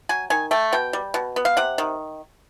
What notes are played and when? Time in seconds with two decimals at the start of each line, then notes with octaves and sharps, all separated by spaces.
0.09 F#3 G#5
0.30 D#3 G#5
0.51 A3 G5
0.73 B2 G5
0.93 G3
1.14 B2
1.36 B3
1.45 F5
1.57 C3 F#5
1.78 D#3